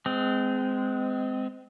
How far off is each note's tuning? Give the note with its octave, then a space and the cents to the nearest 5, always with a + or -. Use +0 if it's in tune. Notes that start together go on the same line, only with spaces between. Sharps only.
G#3 +10 C4 -25